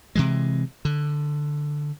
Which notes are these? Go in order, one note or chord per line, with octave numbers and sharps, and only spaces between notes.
C3 E3 G#3
D3